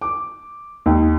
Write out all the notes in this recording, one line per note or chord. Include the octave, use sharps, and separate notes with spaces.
D6
D#2